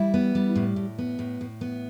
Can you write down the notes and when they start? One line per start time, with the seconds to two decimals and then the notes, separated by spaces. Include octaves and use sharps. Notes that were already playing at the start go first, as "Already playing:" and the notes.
Already playing: G3 E4
0.14 B3
0.35 G3
0.56 A2
0.76 A2
0.98 B3
1.19 A2
1.41 A2
1.61 B3